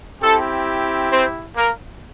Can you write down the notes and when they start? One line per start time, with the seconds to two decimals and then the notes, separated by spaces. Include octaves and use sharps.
0.22 C4 E4 G4 A4
1.11 C4 C5
1.56 A#3 A#4